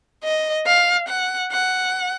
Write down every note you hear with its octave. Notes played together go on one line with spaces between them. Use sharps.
D#5
F5
F#5
F#5